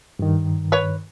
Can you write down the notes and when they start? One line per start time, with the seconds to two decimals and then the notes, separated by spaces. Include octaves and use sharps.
0.19 G2 D#3
0.72 B4 C#5